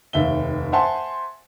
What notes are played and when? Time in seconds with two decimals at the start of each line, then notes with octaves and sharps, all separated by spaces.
0.13 F1 D#2 E5 G7
0.72 C5 E5 F#5 G#5 A5 C6